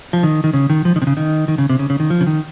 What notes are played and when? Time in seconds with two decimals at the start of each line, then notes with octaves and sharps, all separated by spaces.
0.13 F3
0.23 D#3
0.44 D#3
0.53 C#3
0.70 D#3
0.85 F3
0.96 D#3
1.02 C3
1.07 C#3
1.17 D#3
1.48 D#3
1.58 C#3
1.69 C3
1.79 C#3
1.90 C#3
2.00 D#3
2.10 F3
2.21 C#3
2.27 D#3